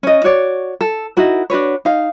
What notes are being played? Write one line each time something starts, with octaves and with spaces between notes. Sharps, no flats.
C#4 D#5
F#4 C#5 D5
A4
D#4 E4 F#4 A#4
D4 F#4 B4 C#5
D#4 F5